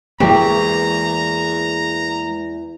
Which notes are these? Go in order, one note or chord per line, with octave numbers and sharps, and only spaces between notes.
E2 E3 G#3 A#3 G4 A#5